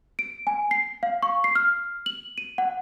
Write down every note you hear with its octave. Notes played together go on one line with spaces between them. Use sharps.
D7
G#5
C7
F5
C#6
C7
F6
F#7
D#7
F#5